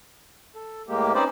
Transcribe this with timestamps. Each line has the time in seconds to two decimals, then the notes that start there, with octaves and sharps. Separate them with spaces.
0.55 A4
0.88 A2 G#3 A#3 G4
1.14 C4 C#4 D#4 B4 C5 D5